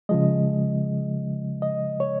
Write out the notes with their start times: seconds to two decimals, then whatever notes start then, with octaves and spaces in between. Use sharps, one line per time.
0.09 C#3 F3 G#3 D#5
1.62 D#5
2.00 C#5